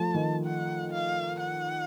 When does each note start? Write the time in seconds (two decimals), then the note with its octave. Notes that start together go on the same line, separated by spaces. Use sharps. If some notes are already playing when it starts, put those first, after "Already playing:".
Already playing: F3 A3 A5
0.14 D#3
0.45 F#5
0.92 F5
1.40 F#5